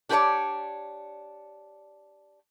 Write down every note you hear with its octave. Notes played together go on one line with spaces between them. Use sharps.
D4 G4 G#4 B4 C#5 D5